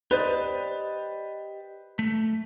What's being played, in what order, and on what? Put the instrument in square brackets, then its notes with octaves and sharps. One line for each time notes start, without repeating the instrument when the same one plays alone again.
[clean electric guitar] G4 D5 D#5 [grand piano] B4 C5
[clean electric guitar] A3